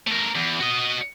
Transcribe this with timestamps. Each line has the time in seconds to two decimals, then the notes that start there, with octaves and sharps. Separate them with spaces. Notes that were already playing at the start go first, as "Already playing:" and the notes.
0.07 A3 A#4
0.35 E2
0.60 F#4 D#5